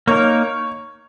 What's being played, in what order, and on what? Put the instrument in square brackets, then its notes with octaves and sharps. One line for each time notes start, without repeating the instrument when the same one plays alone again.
[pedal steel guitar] A#3 D#4 A#4 [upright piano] C#5